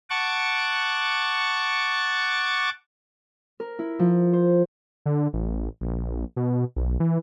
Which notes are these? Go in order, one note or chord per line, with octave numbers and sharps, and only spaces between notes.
F#5 A5 C#6 D6
A#4
E4
F3
C5
D3
A1
A#1
B2
B1
E3